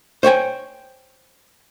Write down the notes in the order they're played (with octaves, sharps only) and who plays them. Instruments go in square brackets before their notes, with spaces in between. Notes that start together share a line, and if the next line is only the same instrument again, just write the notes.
[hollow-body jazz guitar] C5 C#5 G5 G#5